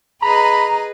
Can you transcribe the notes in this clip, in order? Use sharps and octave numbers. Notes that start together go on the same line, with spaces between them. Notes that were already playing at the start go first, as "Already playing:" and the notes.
G#4 B4 D#5 A#5 B5